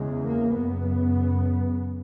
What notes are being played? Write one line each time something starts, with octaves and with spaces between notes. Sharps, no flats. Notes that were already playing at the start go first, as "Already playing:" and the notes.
Already playing: E2 C#3 G#3
A#3
F#2 C#3 B3